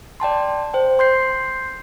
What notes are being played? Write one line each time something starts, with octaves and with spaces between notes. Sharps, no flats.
D5 G5 A5 C6
C5 G5
C6 G6 C7